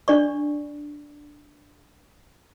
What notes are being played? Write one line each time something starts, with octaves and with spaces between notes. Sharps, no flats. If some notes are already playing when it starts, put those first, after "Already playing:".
D4 D5 C#6